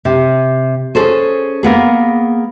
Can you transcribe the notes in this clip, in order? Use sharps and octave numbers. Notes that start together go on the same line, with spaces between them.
C3
C#4 G#4 A4 C5
A#3 B3 G#4